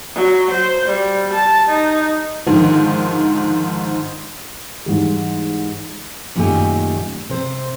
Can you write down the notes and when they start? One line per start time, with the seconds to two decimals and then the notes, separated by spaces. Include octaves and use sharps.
0.15 F#3
0.51 C5
0.86 G3
1.34 A5
1.69 D#4
2.47 G#2 D3 D#3 F3
4.86 G#2 E3 G3
6.35 F#2 A#2 D#3 A3 G4 G#5
7.29 C3 C5